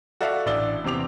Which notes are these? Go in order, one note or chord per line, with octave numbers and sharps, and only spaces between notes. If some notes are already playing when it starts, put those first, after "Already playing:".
F#4 A4 D5 E5 F5
A1 D4 D5 E6 G7
E2 C3 C4 D6 F7